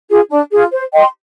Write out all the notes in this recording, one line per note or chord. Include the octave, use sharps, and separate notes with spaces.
F4 G#4
D4
F4 G#4
C5
D#5 G5 C6